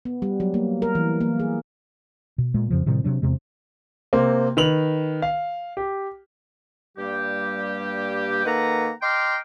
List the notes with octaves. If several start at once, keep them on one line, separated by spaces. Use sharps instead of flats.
B3
G3
F#3
A#3
A#4
E3
A#3
G#4
B2
A#2 G#3 A#3
F2 C#3 F3
A2 C3 D#3 G3
C3 F#3 D4
E2 C3 G#3
C3 A#3 C4
D#3 B4 F7 F#7
F5
G4
G2 G3 A#3 G4
D#3 A#3 A4 B4 F#5 A#5
D#5 G5 A#5 C6 D6 F6